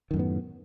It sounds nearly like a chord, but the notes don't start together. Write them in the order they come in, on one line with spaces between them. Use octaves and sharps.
D#3 F#2 A2 B3